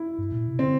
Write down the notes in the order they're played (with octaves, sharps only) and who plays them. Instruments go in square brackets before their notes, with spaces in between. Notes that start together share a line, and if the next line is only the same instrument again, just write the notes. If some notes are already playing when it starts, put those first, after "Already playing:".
Already playing: [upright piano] E4
[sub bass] G2
A#2
C3
[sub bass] D3 [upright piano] C4